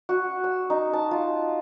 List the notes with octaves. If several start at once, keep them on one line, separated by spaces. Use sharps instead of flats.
F#4
E6
D#4
A5
F4